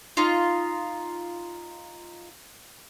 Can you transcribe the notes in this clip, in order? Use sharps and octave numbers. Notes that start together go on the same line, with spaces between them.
D#4 F4